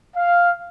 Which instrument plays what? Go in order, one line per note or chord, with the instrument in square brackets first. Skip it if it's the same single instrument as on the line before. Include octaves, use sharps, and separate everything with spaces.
[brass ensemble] F5